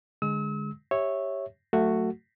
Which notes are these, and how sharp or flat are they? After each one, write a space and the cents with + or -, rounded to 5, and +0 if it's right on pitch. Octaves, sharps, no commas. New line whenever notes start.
D3 +0 G#3 +0 E6 -40
G4 +0 C#5 -10 E5 -10
F#3 +0 A3 +20 F#4 +0